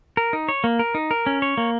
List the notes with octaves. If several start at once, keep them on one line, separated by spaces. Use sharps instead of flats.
A#4
D#4
C#5
A#3
A#4
D#4
A#4
C#4
C#5
A#3